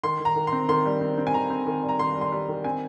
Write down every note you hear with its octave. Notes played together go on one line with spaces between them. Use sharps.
D#3 C6
D#3
A#5
D#3
C6
C4
D#3 C6
G3
C4
C4
G#5
D#3 A#5
C4
D#3
G3
A#5
D#3 C6
G3
C6
G3
D#3
C4 G#5